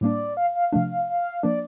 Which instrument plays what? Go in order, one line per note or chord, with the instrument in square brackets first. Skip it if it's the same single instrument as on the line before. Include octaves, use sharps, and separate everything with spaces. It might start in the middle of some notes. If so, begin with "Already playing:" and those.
[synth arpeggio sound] A2 G3 A#3 D4 [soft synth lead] D5
[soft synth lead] F5
F5
[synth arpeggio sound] C3 F3 A3 D4 [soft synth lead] F5
[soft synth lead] F5
F5
[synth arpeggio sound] F3 A#3 D4 [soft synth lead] D5